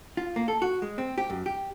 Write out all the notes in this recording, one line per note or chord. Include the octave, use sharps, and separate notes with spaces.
F4
A#3
A4
F#4
G#3
C4
G4
F#2
G4